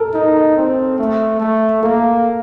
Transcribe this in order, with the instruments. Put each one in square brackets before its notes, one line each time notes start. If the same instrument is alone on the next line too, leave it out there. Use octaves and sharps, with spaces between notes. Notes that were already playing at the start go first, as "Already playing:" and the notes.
Already playing: [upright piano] A4 A#4
[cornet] D#4
C4
A3
A3
[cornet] A#3 [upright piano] A4